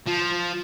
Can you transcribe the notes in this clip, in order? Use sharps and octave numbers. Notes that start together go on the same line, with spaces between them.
F3